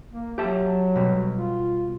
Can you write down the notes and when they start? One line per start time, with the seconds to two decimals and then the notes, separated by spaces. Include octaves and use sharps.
0.12 A#3
0.38 F#3 G4 E5 A5
0.95 B2 G3
1.35 F4